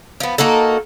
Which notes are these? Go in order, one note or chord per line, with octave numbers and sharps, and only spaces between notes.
F3 B3
A#3 D#4 F#4 A4